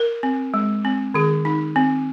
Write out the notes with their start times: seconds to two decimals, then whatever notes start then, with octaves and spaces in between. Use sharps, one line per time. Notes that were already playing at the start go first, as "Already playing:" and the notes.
Already playing: A#4
0.23 C4
0.54 G#3
0.85 C4
1.14 D#3 G#4
1.45 D#4
1.76 C4